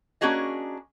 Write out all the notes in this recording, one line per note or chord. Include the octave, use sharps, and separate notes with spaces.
A#3 C#4 D4 F#4 G#4 D#5